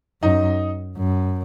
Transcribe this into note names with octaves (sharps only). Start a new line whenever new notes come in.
F#2 D#4 D#5
F#2